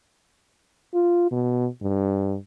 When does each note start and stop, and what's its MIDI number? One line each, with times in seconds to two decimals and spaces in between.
0.94 1.28 65
1.32 1.67 47
1.82 2.37 43